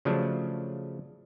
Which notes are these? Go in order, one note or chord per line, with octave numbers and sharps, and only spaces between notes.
C#3 F3 F#3 A3 D4